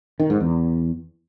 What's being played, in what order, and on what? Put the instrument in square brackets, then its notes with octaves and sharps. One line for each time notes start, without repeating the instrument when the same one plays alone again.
[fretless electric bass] D#3
G#2
E2